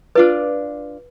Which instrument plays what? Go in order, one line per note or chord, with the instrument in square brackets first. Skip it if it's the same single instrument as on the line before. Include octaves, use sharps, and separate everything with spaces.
[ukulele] D4 F4 D5 [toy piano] B4